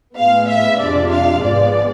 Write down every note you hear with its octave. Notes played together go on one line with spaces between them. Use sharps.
A2 G#3 B3 F5
E5
F2 C3 G#3 D4 F4 D5
F5
G#1 G#2 F3 G#3 B3 D5